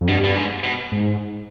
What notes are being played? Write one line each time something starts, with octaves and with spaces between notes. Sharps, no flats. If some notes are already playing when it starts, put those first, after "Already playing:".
F2
G2 B2
B2
G#2
B2
G#2